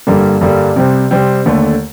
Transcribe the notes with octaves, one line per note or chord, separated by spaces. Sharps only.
G2 D3 G3 A#3
G2 D3 G3 A#3
C3 G3 C4
C3 G3 C4
D#2 D3 A3